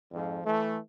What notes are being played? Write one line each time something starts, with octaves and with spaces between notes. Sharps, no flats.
F2 G#2 F3
E3 A3